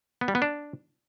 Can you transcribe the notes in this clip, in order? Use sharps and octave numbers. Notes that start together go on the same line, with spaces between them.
B3
G3
B3
D4